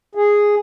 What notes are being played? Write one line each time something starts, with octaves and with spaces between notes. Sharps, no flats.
G#4